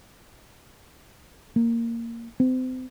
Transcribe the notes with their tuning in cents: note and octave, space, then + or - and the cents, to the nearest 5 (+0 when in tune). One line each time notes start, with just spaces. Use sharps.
A#3 -10
C4 -35